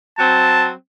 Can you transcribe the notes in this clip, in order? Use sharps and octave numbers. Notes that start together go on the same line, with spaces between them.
F#3 C4 A5